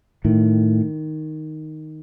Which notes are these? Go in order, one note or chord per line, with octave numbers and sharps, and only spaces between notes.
A2 D#3